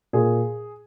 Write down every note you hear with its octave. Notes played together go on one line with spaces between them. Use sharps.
A#2 G#4